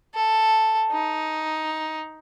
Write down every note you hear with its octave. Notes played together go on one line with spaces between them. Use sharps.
A4
D#4